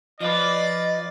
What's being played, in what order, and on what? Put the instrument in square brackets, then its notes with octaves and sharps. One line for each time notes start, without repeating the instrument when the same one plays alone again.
[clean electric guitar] F3 F4 B4 [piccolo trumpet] D5 [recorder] D#5